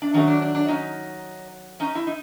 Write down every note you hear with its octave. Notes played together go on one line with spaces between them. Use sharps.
D4
D#3 F#3 A3 C#4
D4
D4
D4
C#4 D#4
C#4 D#4
E4
D#4